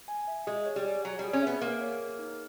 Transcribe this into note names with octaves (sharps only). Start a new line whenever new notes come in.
G#5
E5
G#3 G#4
C#5
G3
G#5
F#3 C#5
G3 G#4
C#4
B3 E5
A#3 G#4
C#5
G#4
D#4